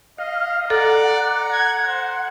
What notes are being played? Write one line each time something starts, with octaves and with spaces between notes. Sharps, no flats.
D#5 F5
A4 D5 F#5 A#5
G#6
C5